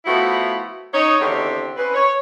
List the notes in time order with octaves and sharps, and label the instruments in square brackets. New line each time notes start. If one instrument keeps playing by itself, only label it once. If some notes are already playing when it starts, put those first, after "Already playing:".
[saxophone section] F3 A3 B3 E4 F#4
D#4 C#5
E2 D3 D#3 C4 G4 C5
C4 C#4 E4 B4
C#5